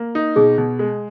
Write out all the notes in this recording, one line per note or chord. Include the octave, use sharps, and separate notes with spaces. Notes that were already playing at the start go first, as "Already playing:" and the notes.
Already playing: A#3
D#4
B2 G#4
B2
G#3